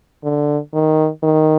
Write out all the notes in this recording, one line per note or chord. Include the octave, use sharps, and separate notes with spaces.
D3
D#3
D#3